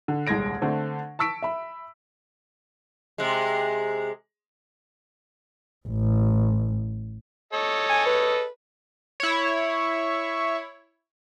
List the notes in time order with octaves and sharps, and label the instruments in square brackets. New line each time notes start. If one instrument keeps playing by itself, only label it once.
[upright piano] D3
D#1 C2 G#3 G#6 A#6 D7
D3 A3 C4 D4
A5 C#6 E6 B6 D7
E5 B5
[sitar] C3 G#3
[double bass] A1
[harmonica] A4 C#5 D#5
[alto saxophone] G#5
B4
[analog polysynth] E4 C#5